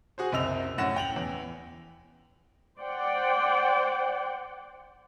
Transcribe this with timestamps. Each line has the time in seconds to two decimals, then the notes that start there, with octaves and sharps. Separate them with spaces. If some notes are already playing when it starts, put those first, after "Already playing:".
0.18 F#4 G#4 C5
0.32 F#1 C2 C4 D#5 E6 F7
0.78 F#2 A2 C#4 F#5 A#6 E7
0.96 G5 F7 F#7
1.16 E2
2.80 C5 D5 F#5 G5